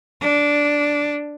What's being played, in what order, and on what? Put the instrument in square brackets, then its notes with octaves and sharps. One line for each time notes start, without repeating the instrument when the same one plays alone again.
[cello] D4